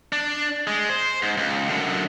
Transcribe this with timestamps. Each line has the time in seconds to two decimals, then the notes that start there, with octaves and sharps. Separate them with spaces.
0.12 D4
0.67 G#3
0.89 C5
1.22 G#2
1.37 C#2
1.68 F#2 D3